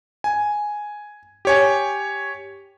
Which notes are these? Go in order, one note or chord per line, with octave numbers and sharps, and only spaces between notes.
G#5
G4 C#5 G#5